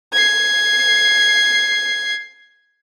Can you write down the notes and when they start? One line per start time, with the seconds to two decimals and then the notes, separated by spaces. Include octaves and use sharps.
0.13 G#6 C7